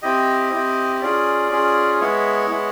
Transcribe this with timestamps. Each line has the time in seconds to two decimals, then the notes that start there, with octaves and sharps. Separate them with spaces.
0.02 C4 E4 G4 D#5
0.52 C4 E4 G4
1.01 C#4 F4 G#4 D5
1.51 C#4 F4 G#4
2.00 G#3 B3 E4 C#5
2.50 G#3 B3 E4